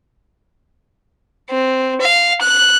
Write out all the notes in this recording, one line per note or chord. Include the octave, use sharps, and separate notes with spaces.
C4
F5
F#6